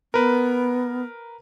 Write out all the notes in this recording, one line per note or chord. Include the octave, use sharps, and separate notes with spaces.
B3 A#4 B4